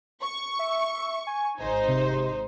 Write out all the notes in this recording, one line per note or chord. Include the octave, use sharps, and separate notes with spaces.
C#6
E5
G#5
G#1 D#4 C5
C3